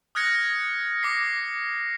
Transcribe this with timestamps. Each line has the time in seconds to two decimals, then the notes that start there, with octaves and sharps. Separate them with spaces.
0.15 D#6 F6 F#6 G#6 A#6 C#7
1.03 D6 A#6 C7